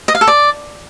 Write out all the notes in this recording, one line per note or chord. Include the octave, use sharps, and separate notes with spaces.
D#5
F5
A4
D5